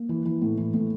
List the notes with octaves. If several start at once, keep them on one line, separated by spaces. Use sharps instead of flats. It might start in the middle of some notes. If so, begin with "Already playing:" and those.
Already playing: A#3
E3
E3
A2
E3
A2